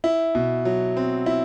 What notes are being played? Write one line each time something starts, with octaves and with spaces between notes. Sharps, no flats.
E4
B2
F#3
C4
E4